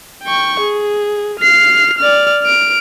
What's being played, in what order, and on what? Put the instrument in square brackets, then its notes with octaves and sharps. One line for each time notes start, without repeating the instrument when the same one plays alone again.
[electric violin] G5 C#6
G#4
F6 C7
D5 F6
F6 D7